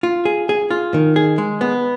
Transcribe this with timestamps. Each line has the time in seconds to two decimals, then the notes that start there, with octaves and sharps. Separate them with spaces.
0.03 F4
0.25 G#4
0.49 G#4
0.71 F4
0.94 D#3
1.16 G#4
1.38 G#3
1.61 B3